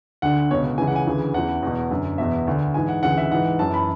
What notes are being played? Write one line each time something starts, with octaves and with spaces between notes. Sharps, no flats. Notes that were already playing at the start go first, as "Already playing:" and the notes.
D2 D3 F#5
C#2 B2 C#5
C#2 C#3 E3 G#5
F#5
G#5
D2 C#3 E3
E2 C#3 E3 F#5
E2 B2
F#2 D3
E2 B2 E5
D2 D3
G#2 E3 G#5
F#5
D2 C#3 E3 F#5
E5
G#2 E3 F#5
F#2 E3 A5
B5